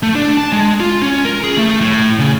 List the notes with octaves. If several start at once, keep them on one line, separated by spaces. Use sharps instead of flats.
A3
D4
A5
G#3
F4
C#4
A#4
G#4
A3
A2
C#3